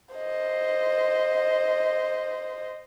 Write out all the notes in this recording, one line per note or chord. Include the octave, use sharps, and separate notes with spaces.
C5 D#5